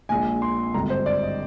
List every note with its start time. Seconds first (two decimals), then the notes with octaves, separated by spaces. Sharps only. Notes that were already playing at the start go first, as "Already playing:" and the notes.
0.09 A#1 A#2 G#3 D4 G#5
0.42 C6
0.74 G#1 G2 D3 A#5
0.90 C5
1.06 D5
1.23 D#5